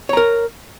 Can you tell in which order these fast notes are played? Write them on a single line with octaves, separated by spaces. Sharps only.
C#5 A#5 A#4